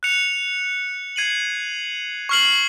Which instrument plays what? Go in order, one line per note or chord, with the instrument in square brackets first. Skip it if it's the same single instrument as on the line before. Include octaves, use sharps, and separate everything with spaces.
[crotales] F#6 C#7 F7
G#6 C7 D#7 F#7
C#6 F6 C7 F#7